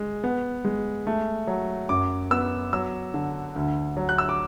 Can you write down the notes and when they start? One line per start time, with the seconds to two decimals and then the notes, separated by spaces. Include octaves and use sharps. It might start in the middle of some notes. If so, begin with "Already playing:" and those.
Already playing: G#3
0.24 B3
0.65 G#3
1.07 A3
1.47 F#3
1.89 F#2 D6
2.31 B3 E6
2.73 F#3 E6
3.14 D3
3.56 D2
3.97 F#3
4.09 F#6
4.18 E6
4.29 D6